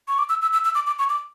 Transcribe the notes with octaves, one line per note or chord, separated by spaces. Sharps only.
C#6
D6
E6
E6
E6
E6
D6
D6
C#6
D6